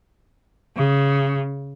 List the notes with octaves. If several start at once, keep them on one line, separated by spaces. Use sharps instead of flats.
C#3